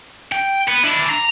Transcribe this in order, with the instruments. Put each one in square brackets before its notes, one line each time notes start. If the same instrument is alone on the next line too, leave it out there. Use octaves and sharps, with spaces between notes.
[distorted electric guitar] G5
B3
D4 E4
A#5